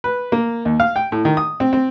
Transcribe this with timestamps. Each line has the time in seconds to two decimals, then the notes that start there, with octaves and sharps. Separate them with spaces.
0.04 B4
0.32 A#3
0.65 D#2
0.80 F5
0.96 G5
1.12 A2
1.25 D#3
1.37 D#6
1.60 C4
1.73 C4